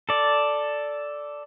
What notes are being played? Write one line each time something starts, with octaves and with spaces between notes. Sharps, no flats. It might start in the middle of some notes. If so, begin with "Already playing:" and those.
A4 D5